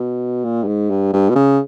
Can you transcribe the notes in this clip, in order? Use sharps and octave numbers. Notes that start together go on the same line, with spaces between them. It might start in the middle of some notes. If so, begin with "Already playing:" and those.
Already playing: B2
A#2
G2
G#2
G2
G2
B2
C#3